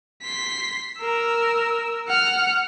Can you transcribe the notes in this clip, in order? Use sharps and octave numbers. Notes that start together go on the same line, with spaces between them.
C6 B6
A#4 E6
F#5 F6